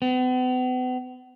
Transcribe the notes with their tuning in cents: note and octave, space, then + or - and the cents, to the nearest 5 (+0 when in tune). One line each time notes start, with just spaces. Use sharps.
B3 +40